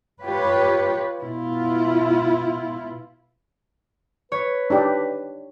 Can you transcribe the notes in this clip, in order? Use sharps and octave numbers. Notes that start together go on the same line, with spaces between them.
F4 G4 B4 C#5
B2 E4 F4
B4 C#5
D4 D#4 G4